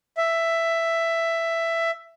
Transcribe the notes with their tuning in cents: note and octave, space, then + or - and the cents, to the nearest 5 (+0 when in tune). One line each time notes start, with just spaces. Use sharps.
E5 +10